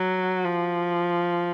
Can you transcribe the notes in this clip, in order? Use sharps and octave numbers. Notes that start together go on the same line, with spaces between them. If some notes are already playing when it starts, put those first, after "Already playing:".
Already playing: F#3
F3